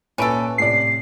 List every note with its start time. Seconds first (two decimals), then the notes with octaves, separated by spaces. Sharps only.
0.18 A#2 C#4 E4 A4 B4 D7
0.58 A2 C3 D5 C7